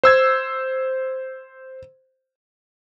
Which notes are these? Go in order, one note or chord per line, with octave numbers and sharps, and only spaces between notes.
C5 E6 G#6